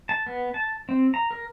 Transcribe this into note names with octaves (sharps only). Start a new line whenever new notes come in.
A5
B3
A5
C4
A#5
A#4